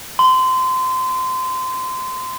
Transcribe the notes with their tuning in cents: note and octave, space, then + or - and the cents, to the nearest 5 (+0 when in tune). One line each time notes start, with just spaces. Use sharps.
C6 -25